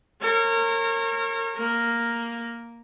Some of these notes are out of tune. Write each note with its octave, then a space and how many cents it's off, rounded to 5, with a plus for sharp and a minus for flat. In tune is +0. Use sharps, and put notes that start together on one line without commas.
A#4 -30 C#5 -30
A#3 +0 A#4 +0